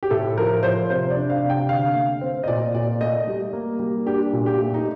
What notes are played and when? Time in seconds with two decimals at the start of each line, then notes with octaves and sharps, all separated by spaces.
0.03 G4
0.11 A2 A4
0.38 F3 A#4
0.63 F3 C5
0.90 C3 C5
1.10 D5
1.17 D4
1.30 F5
1.43 C3
1.50 G5
1.69 D3 F5
1.95 A3
2.21 C4
2.44 D#5
2.48 A#2 D5
2.75 A#2 D5
3.01 A3 D#5
3.27 G3
3.53 A#3
3.79 G3
4.06 D4 G4
4.33 A#2
4.46 G4
4.58 A3
4.74 D#4